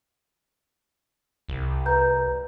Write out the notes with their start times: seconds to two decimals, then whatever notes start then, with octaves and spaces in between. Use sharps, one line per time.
1.49 C2
1.86 B4 A#5 G6